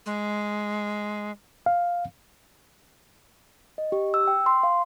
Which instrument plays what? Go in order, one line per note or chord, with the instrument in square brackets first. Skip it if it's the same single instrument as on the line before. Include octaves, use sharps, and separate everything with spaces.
[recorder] G#3
[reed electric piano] F5
[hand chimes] D#5
G4
E6
G5
C6
F5